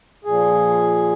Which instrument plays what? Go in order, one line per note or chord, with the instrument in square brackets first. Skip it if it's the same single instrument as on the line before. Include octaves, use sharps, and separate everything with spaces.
[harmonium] A#2 F3 G#4